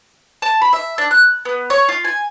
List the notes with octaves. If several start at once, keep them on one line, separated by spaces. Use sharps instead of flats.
A5
B5
E5
D4
F#6
B3
C#5
F4
G#5